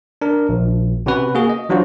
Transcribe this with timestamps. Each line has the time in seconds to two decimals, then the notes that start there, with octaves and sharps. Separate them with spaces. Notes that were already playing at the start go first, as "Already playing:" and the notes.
0.22 D4 A#4
0.49 A#1
1.06 C3 C#4 F#4 B4
1.35 A#3 F#4 G#4
1.50 D#5
1.69 E3 F#3 D4 F4 F#4 C5